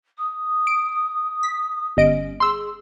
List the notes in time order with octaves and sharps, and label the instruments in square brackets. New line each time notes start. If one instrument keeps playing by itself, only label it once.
[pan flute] D#6
[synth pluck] D7
B6
[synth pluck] G1 D#5 D7 [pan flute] C#4
[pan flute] G#4 [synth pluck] C6 E6